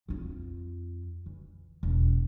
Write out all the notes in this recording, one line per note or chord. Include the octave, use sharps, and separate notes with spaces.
F2 F4
E3
E1